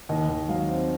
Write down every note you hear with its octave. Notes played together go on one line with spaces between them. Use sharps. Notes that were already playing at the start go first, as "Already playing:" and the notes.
D#2 D#5
D#2
F#3 F5
C4